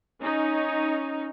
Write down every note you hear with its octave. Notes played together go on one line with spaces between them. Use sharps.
C#4 D#4